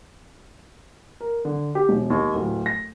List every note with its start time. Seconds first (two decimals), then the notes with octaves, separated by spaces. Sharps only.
1.21 A#4
1.45 D3
1.75 G4
1.89 E1
2.10 D#2
2.34 D1
2.66 A#6